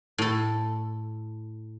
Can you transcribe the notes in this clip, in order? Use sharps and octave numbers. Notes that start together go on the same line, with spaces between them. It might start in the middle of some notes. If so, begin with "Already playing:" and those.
A2 A4